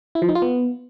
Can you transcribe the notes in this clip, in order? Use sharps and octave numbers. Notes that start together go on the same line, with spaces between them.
E4
F3
D#4
F4
B3